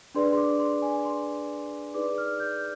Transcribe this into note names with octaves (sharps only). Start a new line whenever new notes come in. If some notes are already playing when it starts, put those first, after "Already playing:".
D4 G#4 B4 D5 C6
C6
D6
C6
G#5
C6
D#4 G#4 B4 D5 D6
F6
G6